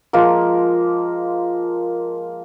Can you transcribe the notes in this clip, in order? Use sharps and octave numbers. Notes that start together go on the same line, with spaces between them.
F3 G#3 A#3 A#4